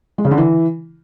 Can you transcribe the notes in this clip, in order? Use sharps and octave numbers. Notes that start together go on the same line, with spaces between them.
G#3
C#3
D3
E3